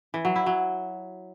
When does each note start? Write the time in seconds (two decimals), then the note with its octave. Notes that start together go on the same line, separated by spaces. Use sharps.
0.14 E3
0.25 F#3
0.36 E4
0.46 F#3